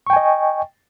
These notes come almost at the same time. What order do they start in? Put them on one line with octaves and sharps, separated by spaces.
C#6 G5 G#5 D#5